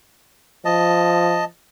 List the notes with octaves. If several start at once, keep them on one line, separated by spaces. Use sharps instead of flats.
F3 D#5 A5